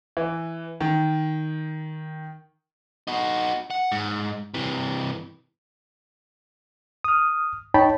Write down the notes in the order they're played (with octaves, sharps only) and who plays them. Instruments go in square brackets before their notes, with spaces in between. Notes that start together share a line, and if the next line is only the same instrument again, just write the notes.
[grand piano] E3
D#3
[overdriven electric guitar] D#4 F#4
F#5
G#2
C3 E3
[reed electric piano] D#6 F6
D#4 C#5 G5 A5 B5